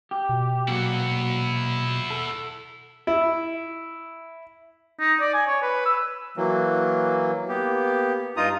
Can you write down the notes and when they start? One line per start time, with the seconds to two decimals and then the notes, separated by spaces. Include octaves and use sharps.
0.11 G4
0.29 B2
0.68 A#2 F#3 E4 F#5
2.10 A4
3.07 E4
5.00 D#4
5.21 D5
5.34 G#5
5.47 C#5
5.62 B4
5.85 E6
6.37 E3 F#3 A#3
7.48 A#3 B3 G4
8.37 G2 D#4 F4 A#5 D#6